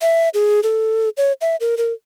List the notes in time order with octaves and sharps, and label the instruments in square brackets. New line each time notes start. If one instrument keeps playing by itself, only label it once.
[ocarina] E5
G#4
A4
C#5
E5
A#4
A#4